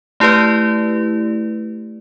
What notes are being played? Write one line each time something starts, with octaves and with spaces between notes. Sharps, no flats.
A3 E4 G4 B4 D5